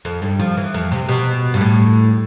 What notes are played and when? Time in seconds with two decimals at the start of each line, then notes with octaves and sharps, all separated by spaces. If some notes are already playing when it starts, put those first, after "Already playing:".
0.05 F2
0.22 G2
0.39 F3
0.57 E3
0.74 F2
0.92 C3
1.09 B2
1.54 G2
1.61 A2